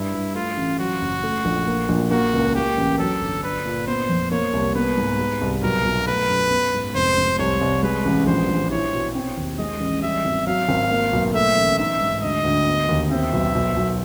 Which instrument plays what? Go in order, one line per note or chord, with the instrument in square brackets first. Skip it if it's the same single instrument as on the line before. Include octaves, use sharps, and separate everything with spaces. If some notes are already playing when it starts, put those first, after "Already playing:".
Already playing: [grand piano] G2 [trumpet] E4
[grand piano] G2
[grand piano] A3 [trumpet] F4
[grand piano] A1
[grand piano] F#3 [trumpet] F#4
[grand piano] F#1
A3
A#1
A#3
A#1
[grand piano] A#3 [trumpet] F#4
[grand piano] C#2
[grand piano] A#3 [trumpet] G4
[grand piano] A1
[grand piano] F#3 [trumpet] A4
[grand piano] G1
[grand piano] D4 [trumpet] B4
[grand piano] A#2
[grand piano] B3 [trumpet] C5
[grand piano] F2
[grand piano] A#3 [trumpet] C#5
[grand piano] C2
[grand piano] B3 [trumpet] B4
[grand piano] G#2
G#3
C2
[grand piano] B1 [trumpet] A#4
[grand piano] B1
[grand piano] A3 [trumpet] B4
[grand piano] F#2
B3
G#2
[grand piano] F1 [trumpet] C5
[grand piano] F1
[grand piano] C2 [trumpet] C#5
[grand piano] C2
[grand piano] G#3 [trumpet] B4
[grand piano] A1
[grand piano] A#1 [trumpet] C5
[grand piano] A#1
[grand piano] E4 [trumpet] C#5
[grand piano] B2
C4
D#2
[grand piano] G#3 [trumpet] D#5
[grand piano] A1
[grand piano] G3 [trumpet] E5
[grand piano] G#1
[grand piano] F#3 [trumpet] F5
[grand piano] G#1
A#3
B1
[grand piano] A3 [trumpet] E5
[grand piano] A1
[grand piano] D#4 [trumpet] E5
[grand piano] G#2
[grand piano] D2 [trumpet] D#5
[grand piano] D2
B3
D#2
[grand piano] C4 [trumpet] E5
[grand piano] B1
B1
B1